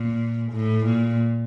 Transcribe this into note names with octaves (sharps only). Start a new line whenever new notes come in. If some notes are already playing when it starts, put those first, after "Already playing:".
Already playing: A#2
A2
A#2